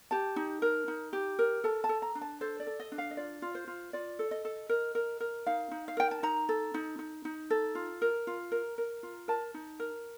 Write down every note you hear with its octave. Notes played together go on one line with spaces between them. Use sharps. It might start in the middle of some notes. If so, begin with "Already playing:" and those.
G4 A5
D#4
A#4
D#4
G4
A#4
A4 A5
A5
A4
A#5
D4
A5
A4 C5
D5
A4
D#5
D4
F5
D#5
F4 D5
F4
C5
F4
F4 D5
A4
D#5
A4
A#4
A#4
A#4
D#4 F5
D#4
F5
A#4 G5
A5
D#4 A#5
A4
D#4
D#4
D#4
A4
F4
A#4
F4
A#4
A#4
F4
A#4 A5
D#4
A#4